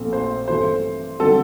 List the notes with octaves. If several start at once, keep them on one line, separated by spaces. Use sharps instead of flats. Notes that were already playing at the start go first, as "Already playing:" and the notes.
Already playing: A#1 A#2 A3 C4
C5
G2 E3 A3 C4 C5
D3 G3 C4 A4